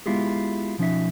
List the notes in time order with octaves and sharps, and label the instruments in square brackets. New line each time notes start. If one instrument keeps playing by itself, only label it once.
[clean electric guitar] G#3 B3 E4 F4 G4 G#4
B1 F3 C#4 D#4 E5